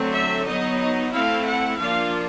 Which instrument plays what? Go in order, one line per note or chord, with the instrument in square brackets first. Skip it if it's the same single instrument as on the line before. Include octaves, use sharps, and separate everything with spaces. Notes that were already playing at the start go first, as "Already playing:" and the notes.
Already playing: [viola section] D3 F#3 A3 C4
E5
F#3 B3 D#4 D#5
D#5
A3 C4 E4 F5
F#5
F3 A#3 D4 F4 F5